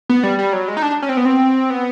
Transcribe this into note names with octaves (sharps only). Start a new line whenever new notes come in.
B3
G3
G3
F#3
G#3
D#4
D4
C#4
C4
B3
C4
B3